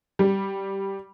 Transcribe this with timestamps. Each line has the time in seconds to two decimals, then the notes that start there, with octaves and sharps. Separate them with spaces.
0.19 G3